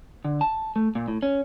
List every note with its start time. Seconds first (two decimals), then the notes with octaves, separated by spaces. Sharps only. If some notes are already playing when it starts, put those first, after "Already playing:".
0.25 D3
0.41 A5
0.76 A3
0.95 A#2
1.08 A2
1.23 C#4